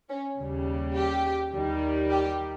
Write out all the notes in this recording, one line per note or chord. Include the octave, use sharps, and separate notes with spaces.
C#4
D#2 C#3 G3
G4
D#2 D#3 G3
G4